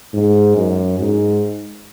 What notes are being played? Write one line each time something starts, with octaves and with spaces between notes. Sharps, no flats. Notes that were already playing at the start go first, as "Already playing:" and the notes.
G#2
F#2
G#2